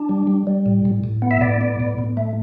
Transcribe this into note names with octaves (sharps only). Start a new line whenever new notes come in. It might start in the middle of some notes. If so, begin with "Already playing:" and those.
Already playing: D4
G3
G3
G3
A2
A2
A2
B3
E5
A2 D5
B3
A2
A2
A3